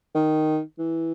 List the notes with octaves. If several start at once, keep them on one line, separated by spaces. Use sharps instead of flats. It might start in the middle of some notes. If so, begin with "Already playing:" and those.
D#3
E3